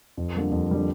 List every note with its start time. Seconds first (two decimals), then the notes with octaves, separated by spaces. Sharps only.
0.17 F2
0.35 D3 G3 A#3
0.51 F2
0.69 D3 G3 A#3